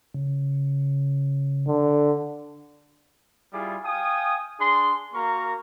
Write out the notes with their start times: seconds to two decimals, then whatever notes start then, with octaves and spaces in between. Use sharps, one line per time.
0.14 C#3
1.67 D3
3.53 G3 E4 F4 G#4 D6
3.85 F5 G5 G#5 D#6
4.60 D4 G#4 C6
5.14 A#3 F#4 A#4 A#5 C#6